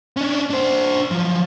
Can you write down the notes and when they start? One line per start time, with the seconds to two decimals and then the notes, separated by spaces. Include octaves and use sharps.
0.17 C#4 D4
0.50 D4 C5
1.11 F3 F#3